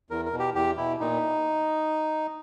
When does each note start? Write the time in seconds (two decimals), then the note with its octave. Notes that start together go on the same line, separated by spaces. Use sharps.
0.11 E2 A#4
0.25 A#4
0.33 B2
0.39 G4
0.55 E2 G4
0.77 B2 E4
1.00 A#2 D#4